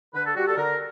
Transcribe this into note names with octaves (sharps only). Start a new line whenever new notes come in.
D3 B4
A4
G3 F#4
A4
D3 A#4